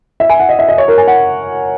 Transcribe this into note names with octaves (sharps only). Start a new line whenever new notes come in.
E5
G#5
F#5
D#5
E5
D#5
C#5
A#4
G#5
F#5